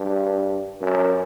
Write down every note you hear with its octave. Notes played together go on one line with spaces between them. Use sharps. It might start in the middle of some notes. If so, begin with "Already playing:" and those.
Already playing: G2
F#2